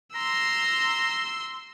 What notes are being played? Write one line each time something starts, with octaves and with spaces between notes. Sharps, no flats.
A#5 C6 E6